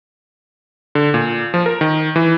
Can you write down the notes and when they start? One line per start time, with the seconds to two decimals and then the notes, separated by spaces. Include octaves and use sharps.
0.95 D3
1.14 A#2
1.54 F3
1.66 A#4
1.81 D#3
2.16 E3